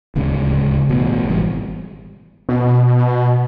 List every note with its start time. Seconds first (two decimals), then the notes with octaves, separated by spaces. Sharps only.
0.15 D1 C#2 C#3
0.89 A1 B2
1.29 G#1 E3 G3
2.49 B2